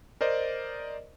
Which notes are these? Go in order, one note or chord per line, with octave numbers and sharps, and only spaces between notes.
A#4 C5 D5 D#5